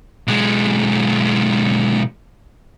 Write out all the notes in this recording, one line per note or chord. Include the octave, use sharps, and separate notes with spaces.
B1 G#3